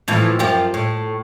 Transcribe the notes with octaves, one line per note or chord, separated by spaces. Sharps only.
A2 E3 F3
F#2 F3 G4
A2